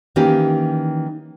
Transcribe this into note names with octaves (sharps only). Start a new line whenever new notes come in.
D#3 E3 A#3 C#4 G4